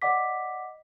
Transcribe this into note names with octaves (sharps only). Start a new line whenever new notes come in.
D5 D#5 F#5 D6 B6